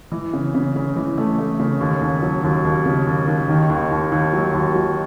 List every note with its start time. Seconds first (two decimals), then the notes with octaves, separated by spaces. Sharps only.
0.12 E3
0.33 C#3
0.54 C#3
0.76 C#3
0.96 E3
1.17 A3
1.39 A3
1.59 C#3
1.80 D#2
2.02 D#2
2.22 F#3
2.43 D#2
2.65 D#2
2.85 C#3
3.07 D#2
3.27 D#2
3.49 D#3
3.69 D#2
3.91 D#2
4.12 D#2
4.33 F#3
4.54 D#2
4.75 F#3